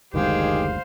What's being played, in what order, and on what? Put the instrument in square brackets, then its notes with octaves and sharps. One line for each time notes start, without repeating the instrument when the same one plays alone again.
[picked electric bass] F#1 D2 G#3 [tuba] D#3 [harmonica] G4 G#4 [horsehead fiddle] C5 F5